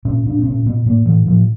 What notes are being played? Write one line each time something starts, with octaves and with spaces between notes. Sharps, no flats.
A#2 C#4
A#2 D4
C4
A#2 C#4
A#2 B3
A2 A#3
A2 E3
A2 F3